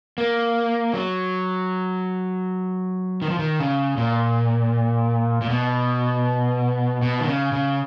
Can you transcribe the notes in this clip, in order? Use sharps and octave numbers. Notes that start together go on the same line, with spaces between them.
A#3
F#3
D#3
F3
D#3
C#3
A#2
A#2
B2
B2
D#3
C#3
C#3